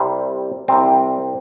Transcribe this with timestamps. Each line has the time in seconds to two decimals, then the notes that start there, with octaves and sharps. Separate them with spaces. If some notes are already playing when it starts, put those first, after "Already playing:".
Already playing: C2 C3 G3
0.68 C2 C3 G3 C4